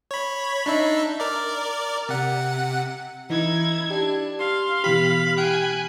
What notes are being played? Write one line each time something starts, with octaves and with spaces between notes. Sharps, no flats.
C#5 B5
D4 D#4 E5
A#4 D5
C3 F#5
E3 D#4 E4 G#6
D4 G4
F5 C6
B2 E3 G4 B5
G5 G#5 F#6